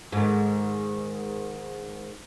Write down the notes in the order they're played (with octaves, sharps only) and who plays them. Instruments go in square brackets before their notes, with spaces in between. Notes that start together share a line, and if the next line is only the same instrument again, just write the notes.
[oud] G#2 D#3